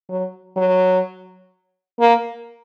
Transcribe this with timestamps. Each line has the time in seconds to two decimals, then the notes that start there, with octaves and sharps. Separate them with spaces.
0.10 F#3
0.57 F#3
1.99 A#3